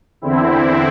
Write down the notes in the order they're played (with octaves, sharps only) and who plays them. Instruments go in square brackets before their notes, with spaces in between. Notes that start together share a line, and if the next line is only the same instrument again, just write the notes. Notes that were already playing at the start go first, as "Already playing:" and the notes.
[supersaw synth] E2 D3 C4 E4